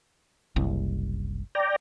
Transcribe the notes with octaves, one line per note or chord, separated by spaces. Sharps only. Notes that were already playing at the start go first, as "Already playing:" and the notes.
F#1 C2
D5 G5 A#5